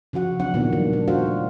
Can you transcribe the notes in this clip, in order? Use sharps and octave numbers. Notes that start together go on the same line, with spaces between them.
C#3 F3 F#4 F#5
F#3 C4 D4 F#5
A#2 D#3 B3
D#3 F3 G3 A#3 D4
D4
A3 F4 F#4 C5 F5 F#5